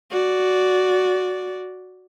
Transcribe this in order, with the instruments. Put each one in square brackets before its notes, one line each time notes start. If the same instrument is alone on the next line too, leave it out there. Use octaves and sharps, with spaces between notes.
[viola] F#4 D5